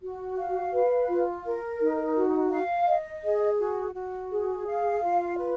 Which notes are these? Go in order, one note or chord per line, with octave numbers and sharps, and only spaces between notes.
F#4
F5
B4
F4
A#4
D#4
F#4
F5
D#5
G#4
F#4
F#4
G#4
F5
F4
B4